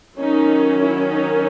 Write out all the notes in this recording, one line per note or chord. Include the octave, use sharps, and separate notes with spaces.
D#3 F#3 C#4 D#4
E4
D#4